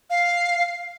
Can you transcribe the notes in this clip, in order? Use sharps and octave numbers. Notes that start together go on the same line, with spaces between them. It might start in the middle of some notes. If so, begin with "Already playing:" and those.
F5